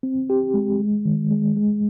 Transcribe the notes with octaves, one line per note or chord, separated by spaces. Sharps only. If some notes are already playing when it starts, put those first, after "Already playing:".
C4
G4
G#3
G#3
D#3
G#3
G#3